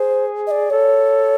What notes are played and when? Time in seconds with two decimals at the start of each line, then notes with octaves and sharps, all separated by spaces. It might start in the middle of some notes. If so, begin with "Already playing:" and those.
Already playing: G#4 C5
0.47 D#5
0.51 D5
0.70 A4 C#5